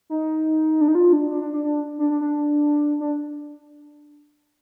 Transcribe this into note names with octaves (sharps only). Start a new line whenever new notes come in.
D#4
D4
D#4
F4
D4
D4
D4
D4
D4
D4
D4
D4
D4